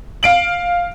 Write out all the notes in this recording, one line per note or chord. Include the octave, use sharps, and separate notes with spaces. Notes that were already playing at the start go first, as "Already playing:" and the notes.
F5 D7 F#7